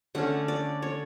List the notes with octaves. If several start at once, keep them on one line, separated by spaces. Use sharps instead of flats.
D3 A3 C#4 F#5
D5
C#5